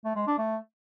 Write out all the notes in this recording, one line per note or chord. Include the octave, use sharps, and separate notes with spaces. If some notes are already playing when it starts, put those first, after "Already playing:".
A3
G#3
D4
A3